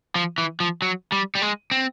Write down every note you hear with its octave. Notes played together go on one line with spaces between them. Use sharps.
F3
E3
F3
F#3
G3
G3
G#3
C4